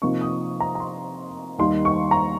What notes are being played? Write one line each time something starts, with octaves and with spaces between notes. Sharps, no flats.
C3 F3 A#3 D#4 C#6
D#6
A#5
A#5
C6
D#2 D#3 G3 A#3 D#4 C6
C#6
A#5